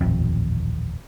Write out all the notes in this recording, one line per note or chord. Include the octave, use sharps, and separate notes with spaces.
D#1 A1 F2